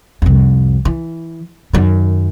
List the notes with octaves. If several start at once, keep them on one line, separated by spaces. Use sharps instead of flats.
C2 F2
E3
F#2 D#3